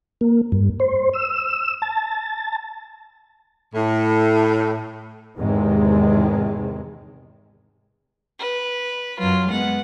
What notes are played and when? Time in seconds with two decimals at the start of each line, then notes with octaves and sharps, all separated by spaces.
0.21 A#3
0.52 G2
0.80 C5
1.14 E6
1.82 A5
3.74 A2
5.37 E2 G#2 C3 D#3 G#3
8.39 B4
9.19 F#2 F#3 F4
9.51 G#3 B3 F#5